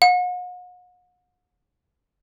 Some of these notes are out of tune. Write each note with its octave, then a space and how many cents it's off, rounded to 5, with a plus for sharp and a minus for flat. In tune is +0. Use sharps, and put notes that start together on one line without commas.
F#5 -45